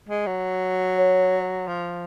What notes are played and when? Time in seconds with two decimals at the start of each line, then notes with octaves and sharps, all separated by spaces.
0.09 G#3
0.27 F#3
0.97 C#5
1.68 F3